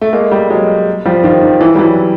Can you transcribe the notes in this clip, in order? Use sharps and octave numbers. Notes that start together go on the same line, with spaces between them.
A3
G#3 A#3
G3 A3
F#3 G#3
F3 G3
D#3 F3
D#3
E3
G3
E3 F#3